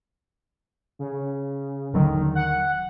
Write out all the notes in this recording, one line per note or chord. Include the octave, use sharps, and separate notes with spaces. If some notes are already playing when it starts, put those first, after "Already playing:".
C#3
D#1 D3 D#3 F#3
F#5